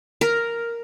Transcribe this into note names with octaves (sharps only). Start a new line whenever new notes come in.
A#4